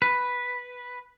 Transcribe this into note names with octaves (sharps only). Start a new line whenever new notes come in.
B4